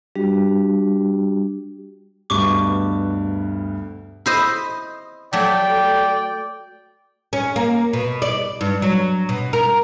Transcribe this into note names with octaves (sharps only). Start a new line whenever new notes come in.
G3 D4 F#4 G4
D2 G2 B2 C#6 D6
E4 C5 D#5
F#3 A3 D5 G5
C#4
A#3
B2
D5
G2
F#3
B2
A#4